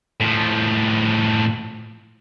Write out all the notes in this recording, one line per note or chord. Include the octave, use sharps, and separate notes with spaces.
A2 F3